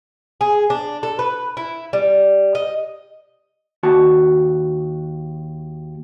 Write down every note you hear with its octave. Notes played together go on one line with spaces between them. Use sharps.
G#4
D4
A4
B4
E4
G3
D#5
D#2 F#4 A5